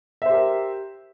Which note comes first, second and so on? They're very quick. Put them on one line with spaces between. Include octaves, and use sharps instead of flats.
E5 C5 G4 A#4